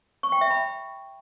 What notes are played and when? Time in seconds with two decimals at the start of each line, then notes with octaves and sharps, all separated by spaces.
0.23 C#6
0.32 G5
0.41 E5
0.50 B5